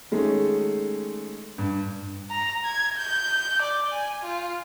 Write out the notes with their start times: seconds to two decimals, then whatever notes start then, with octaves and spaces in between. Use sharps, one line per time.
0.12 D#3 G#3 A3 C#4
1.58 G2
2.31 A#5
2.65 G#6
2.98 G6
3.62 D5
3.92 G#5
4.24 F4